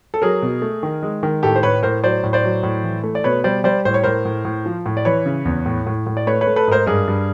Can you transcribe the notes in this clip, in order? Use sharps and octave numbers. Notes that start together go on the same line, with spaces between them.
A4
F#3 G#4 A#4
B2
A3
D#3
G#3
D#3
A2 G4 A4
C5
A2 B4 C#5
A2 A#4 C5
F#3 C5 D5
A2
C5 D5
F#3
A2
E3
A3
D5
B2 B4 C#5
G3 C5 D5
G3 C5 D5
A2 C5
C#5
A2 A#4 C5
A2
A2
F3
A2
D5
E3 B4 C#5
C#3
E2
A2
A2
A2
D5
A3 B4 C#5
B4 C#5
A3
A4 B4
G#2 A#4 C5
G2 G#4 A#4
G2